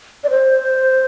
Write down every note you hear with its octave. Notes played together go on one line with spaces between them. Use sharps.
D5
C5